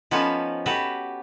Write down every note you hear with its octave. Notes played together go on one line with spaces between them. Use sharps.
F3 B3 C#4 D#4 A4 B4
F#4 G4 A4 B4 E5